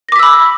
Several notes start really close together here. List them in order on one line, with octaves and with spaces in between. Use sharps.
A#6 D6 B6 E6 B5